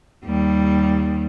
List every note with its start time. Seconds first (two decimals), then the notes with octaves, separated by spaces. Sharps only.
0.25 D#2 G3